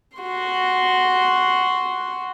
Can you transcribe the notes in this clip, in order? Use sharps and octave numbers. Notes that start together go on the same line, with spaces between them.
F#4 C6